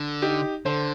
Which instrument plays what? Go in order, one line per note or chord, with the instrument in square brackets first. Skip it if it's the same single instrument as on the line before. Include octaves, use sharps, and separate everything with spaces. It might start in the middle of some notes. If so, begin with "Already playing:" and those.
Already playing: [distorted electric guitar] D3
[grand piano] D#4 G4
[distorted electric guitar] D3 [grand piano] A4 C5